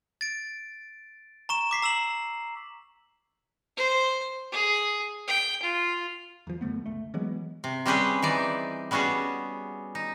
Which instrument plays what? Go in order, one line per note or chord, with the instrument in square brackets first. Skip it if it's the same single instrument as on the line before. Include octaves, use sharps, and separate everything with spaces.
[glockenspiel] A6 D7
A#5 C#6 E7
D6 B6 C7
A#5 E6 E7 F#7
[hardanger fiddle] C5
G#4
G5
F4
[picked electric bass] E2 F3
F#2 D3 A3 B3
C#2 A3
E3 F#3 G#3 B3
[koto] C3
G3 C4 C#4 G4 G#4 B4
E3 D#4 D5
G3 B3 C#4 F#4 G#4
D#4